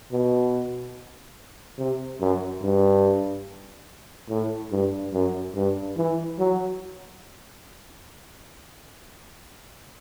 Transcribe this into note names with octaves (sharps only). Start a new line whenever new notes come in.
B2
C3
F#2
G2
A2
G2
F#2
G2
E3
F#3